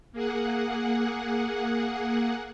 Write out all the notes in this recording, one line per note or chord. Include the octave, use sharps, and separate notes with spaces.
A#3 G#4 F#5